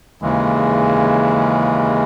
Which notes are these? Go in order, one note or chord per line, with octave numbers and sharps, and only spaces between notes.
D#2 C#3 E3 G#3